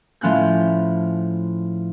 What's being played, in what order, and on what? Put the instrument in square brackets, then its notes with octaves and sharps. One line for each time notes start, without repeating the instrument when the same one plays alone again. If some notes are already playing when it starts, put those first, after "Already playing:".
[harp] A2 F3 C#4 F#6 G6